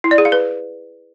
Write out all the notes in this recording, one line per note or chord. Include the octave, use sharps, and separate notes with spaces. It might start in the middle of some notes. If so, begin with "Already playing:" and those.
E4
D5
G#4
F5
B4